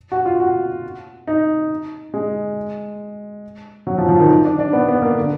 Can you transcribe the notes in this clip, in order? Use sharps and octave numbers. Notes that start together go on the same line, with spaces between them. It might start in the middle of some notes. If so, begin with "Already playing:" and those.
F#4
F4
F#4
D#4
G#3
F#3
F3
F3
D#3
D#3
D4
D4
B3
B3
A#3
D3